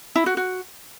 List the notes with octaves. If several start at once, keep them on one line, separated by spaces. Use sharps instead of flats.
E4
F#4
F#4